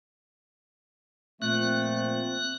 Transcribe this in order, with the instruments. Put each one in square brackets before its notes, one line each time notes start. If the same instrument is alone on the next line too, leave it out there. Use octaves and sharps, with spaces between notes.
[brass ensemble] A#2 F3 C4 [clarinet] A3 [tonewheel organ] F#6